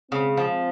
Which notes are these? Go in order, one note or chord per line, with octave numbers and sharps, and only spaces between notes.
C#3 G#3 C4
F3